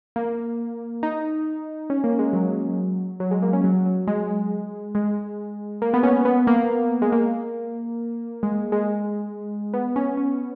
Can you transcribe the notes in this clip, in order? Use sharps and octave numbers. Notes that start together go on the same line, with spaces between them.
A#3
D#4
C#4
A#3
G#3
F#3
F#3
G#3
A#3
C#4
F#3
F#3
G#3
G#3
A#3
B3
C#4
B3
A#3
G#3
A#3
G#3
G#3
B3
C#4
C#4